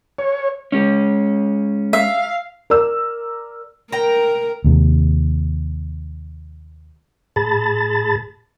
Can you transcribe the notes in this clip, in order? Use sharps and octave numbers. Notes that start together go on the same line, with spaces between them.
C#5
G#3 C#4
E5 F5
A#4 D5 E6
A#4 G5 A#5
D#2 C3
A2 G#4 A5 B5 A6